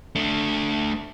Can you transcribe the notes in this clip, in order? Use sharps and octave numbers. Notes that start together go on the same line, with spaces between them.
A3 D4